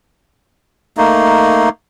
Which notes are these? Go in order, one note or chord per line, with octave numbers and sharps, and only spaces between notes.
A3 A#3 D#4